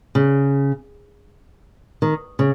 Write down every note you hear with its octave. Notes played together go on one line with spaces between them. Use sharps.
C#3
D#3
C#3